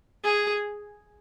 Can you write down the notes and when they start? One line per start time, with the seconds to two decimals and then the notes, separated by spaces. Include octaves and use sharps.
0.24 G#4